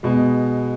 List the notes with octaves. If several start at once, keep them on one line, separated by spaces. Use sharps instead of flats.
B2 G#3